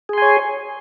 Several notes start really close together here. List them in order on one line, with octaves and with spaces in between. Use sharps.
G#4 C6 G#5 C#5